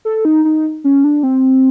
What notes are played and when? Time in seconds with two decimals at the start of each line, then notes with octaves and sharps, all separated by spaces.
0.05 A4
0.25 D#4
0.45 D#4
0.84 C#4
1.04 D4
1.23 C4